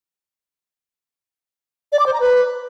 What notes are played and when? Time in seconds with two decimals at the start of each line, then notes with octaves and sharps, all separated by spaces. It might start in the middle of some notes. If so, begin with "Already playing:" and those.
1.92 D5
1.99 D6
2.06 C5
2.13 A#5
2.20 B4